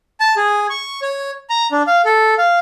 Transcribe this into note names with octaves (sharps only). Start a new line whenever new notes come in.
A5
G#4
C#6
C#5
A#5
D4
F5
A4
F5